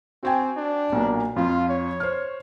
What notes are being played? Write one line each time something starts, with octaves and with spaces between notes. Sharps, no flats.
C4 F#4 G5 G#5
D4
B1 A#2 A#3
F2 F3 F4
C#5
C5 F6